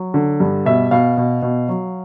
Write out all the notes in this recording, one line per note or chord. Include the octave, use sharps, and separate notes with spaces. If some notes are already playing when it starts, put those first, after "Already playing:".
Already playing: F#3
D3
G2
B2 E5
B2 F5
B2
B2
F#3